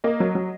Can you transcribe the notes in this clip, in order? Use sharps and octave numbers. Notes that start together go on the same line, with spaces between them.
A#3 D#5
F#3
F#3